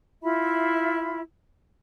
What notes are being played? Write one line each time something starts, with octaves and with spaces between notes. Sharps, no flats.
E4 F4 E5 B5